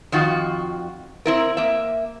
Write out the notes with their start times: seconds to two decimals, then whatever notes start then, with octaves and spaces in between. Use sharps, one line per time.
0.12 F2 D#3 F4 F#4
1.26 C4 E4 A#4
1.57 A#3 E5